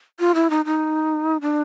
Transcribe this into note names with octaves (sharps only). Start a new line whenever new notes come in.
F4
E4
D#4
D#4
D4